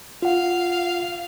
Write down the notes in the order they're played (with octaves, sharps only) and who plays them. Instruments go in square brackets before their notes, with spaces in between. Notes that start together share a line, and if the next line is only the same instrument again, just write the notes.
[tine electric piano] F4 F#5 [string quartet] F5